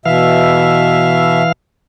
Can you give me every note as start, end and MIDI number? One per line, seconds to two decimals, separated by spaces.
0.06 1.43 47
0.06 1.52 52
0.06 1.43 76
0.06 1.52 77